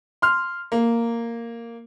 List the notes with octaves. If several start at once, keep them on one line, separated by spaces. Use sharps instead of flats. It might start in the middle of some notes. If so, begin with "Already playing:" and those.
C6 F6
A#3